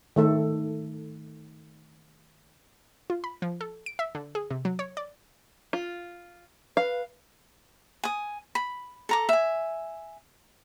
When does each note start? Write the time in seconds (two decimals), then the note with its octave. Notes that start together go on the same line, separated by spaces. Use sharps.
0.16 D#3 A3 A4
3.10 F4
3.24 B5
3.42 F3
3.61 A4
3.86 D7
3.99 E5
4.15 D3
4.35 G#4
4.50 C3
4.65 F#3
4.79 C#5
4.97 D5
5.73 F4
6.77 B4 F5
8.04 G#5 D#6
8.55 B5
9.09 A4 A#5 D6
9.29 E5 G#5